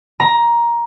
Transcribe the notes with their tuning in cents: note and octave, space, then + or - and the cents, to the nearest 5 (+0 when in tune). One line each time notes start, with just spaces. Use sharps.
A#5 +15